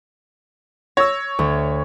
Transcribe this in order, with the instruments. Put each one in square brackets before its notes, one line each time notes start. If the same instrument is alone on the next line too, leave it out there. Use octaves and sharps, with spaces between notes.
[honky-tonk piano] C#5 [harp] E6 G#6 A#6
[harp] D2